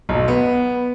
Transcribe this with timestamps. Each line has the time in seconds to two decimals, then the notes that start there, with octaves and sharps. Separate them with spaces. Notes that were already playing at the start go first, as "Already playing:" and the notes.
0.09 B1
0.28 B3